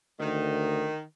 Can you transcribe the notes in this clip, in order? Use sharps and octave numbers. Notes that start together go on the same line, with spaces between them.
D2 D#3